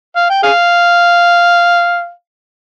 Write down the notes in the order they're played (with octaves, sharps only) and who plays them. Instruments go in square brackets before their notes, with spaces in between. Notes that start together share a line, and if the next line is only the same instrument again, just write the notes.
[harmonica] F5
G5
G#4 F5